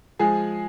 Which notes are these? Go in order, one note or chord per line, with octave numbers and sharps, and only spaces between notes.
F3 G#3 G#4